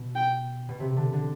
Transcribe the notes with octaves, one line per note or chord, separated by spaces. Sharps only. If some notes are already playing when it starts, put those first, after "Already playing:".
Already playing: B2
G5
B2
C3
D3
D3